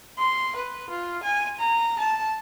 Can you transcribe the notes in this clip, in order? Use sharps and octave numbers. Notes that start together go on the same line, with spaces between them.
C6
B4
F4
G#5
A#5
A5